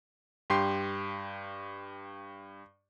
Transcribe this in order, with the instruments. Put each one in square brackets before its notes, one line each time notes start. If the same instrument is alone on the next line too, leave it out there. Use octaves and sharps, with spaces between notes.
[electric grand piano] G2 G4 C6 C7